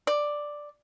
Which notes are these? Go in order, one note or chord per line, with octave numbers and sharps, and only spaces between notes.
D5